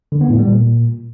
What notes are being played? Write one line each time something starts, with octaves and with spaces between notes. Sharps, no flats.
D3
B3
A2
G3
A#2